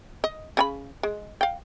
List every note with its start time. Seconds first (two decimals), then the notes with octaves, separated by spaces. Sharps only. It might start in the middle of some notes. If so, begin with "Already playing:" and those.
0.24 D#5
0.57 C#3 G#5 B5
1.03 G#3
1.41 F5 G5